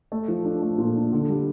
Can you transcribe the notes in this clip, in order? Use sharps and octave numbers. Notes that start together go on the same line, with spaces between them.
A3
F3
D4
A3
A#2
D4
D3
G3